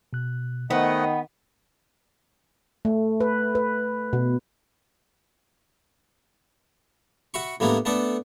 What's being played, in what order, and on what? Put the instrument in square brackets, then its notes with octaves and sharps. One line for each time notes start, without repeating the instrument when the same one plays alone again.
[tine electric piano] B2 F#6
[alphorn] D#3 [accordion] A3 D#5 F#5 [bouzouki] B3 [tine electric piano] C5
[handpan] A3
B4
B4
B2
[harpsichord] F#4 E5 B5 C#6
A2 G3 A#3 B3 D4 E4
A3 B3 D4 A4 D5 E5